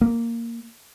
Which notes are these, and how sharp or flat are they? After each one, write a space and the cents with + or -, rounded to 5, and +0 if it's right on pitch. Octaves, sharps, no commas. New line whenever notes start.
A#3 -5